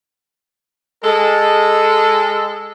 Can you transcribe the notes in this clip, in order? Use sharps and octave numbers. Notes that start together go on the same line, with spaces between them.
G#3 A4